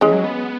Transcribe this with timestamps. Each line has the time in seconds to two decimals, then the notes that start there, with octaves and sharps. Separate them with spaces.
0.01 E3 G#3 C#4
0.13 F#3
0.24 B3